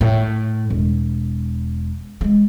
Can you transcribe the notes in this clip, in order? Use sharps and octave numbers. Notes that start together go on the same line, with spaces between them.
A2
E1
G#3 A3